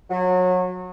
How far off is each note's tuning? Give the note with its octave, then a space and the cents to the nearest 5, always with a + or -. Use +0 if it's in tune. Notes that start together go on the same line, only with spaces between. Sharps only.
F#3 -25